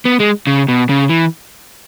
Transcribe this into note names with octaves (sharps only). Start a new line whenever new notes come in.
B3
G#3
C#3
B2
C#3
E3